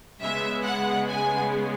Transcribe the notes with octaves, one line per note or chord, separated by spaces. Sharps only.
C#3 G#3 B3 E5
F#5
G#5